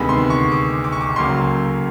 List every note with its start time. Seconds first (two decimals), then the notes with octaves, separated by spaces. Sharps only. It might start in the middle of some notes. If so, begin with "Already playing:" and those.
Already playing: D2 C3 D#3 G#3 B3 B5
0.09 C6
0.30 C#6
0.52 D6
0.84 D6
0.92 C#6
1.01 D6
1.16 C#2 C#3 F#3 A#3 C6